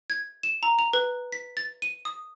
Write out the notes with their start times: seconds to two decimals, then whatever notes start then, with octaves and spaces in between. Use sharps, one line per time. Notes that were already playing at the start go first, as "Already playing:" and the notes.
0.10 G#6
0.43 E7
0.63 A#5
0.79 F7
0.93 B4
1.32 B6
1.57 A6
1.82 D#7
2.05 D#6